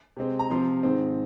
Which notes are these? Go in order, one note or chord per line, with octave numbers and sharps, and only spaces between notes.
C3 G#3 C4
A#5
C3 F3 C4 C6
G#2 D#3 G#3 C4